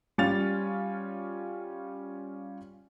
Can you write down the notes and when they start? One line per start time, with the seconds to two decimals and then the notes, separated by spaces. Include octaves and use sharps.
0.18 G3 C#4 F4 A6 F7